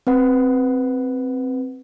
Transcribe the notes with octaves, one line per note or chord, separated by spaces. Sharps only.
C4 B4 F#5